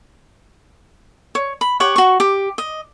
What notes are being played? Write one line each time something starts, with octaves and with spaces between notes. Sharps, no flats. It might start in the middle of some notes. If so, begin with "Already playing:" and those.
C#5
B5
G4 C#5 F#5 C#6
F#4 C#6
G4
D#5